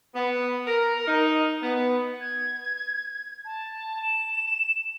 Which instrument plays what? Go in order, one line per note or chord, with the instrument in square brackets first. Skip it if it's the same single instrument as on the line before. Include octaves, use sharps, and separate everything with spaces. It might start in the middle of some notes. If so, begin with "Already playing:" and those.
[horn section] B3
A#4
D#4
B3
[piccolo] G#6
A5
E7